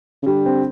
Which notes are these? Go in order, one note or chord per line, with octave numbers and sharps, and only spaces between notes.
C#3
D3 G3
C4